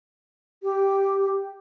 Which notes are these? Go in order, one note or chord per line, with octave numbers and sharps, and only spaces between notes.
G4